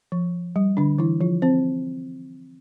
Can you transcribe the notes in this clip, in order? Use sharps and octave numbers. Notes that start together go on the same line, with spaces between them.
F3
G3
D3 D4
E3 E4
F3 F4
C4 C5